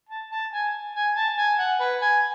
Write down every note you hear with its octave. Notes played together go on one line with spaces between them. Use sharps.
A5
A5
G#5
G#5
A5
G#5
F#5
B4
G#5